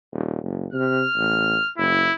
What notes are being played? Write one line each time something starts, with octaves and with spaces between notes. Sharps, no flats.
D#1
F#1
C3 F6
A1
F#1 E4